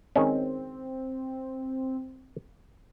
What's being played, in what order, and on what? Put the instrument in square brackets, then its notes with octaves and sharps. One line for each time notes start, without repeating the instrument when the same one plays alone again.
[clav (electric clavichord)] D#3 G#3 C#4 [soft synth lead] C4